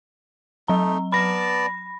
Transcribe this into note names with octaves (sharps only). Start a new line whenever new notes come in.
F#3 A3 D#4 A#5
B3 D5 A5 B5 A#6